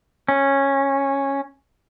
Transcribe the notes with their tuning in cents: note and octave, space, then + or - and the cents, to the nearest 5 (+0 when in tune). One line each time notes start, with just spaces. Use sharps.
C#4 -10